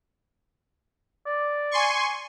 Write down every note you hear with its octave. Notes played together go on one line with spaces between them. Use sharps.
D5
G#5 C6 C#6